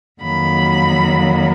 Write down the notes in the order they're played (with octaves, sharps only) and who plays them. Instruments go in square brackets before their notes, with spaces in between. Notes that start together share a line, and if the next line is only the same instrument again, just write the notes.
[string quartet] F2 D#3 F#3 A#3 B5